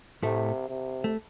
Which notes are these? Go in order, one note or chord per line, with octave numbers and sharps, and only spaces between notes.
A2 C3 A3
C3
A3